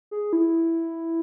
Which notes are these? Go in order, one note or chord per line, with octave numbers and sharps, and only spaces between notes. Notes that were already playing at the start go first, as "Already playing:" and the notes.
G#4
E4